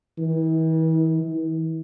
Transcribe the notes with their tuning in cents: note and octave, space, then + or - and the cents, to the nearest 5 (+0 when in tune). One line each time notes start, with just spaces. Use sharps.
E3 -45
E3 -45